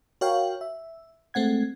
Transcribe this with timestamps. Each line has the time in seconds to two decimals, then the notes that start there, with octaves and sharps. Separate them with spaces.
0.21 F#4 A#4 C#5 F5 G5
0.61 E5
1.34 G#3 A3 C4 F#5 G#6